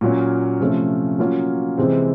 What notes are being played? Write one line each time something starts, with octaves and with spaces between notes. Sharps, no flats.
A#2 F#3 A#3 C#4
C3 F3 A3 C#4
F#3 A#3 C#4 F4
C3 E3 G#3 C4